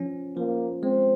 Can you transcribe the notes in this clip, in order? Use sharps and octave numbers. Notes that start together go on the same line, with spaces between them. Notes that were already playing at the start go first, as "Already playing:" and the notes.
Already playing: F3 C#4
F3 A#3
G#3 C4